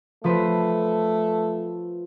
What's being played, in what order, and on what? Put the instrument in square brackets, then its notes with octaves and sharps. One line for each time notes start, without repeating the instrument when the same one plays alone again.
[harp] F3 B4 C5 [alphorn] A3